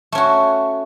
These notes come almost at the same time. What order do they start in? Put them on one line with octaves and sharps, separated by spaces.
A3 C#4 F#4